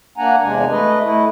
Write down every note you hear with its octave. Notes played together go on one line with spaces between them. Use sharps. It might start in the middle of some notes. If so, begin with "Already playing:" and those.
A#3 D4 F#5 G#5 A#5
E2 C3 G#3 D4 G#5
A3 B4 D#5
A3 E4